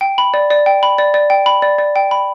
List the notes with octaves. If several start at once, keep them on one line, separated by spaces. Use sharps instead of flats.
G5
B5
D5
D5
G5
B5
D5
D5
G5
B5
D5
D5
G5
B5